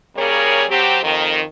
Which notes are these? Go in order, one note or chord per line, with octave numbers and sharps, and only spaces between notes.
C#3 G3 A#3 G#4 A#4 C#5
F#3 C4 G4
F2 D#3